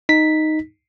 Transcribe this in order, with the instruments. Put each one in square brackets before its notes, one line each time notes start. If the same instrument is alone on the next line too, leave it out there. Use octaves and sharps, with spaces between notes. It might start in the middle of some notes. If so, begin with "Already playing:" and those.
[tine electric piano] D#4 B6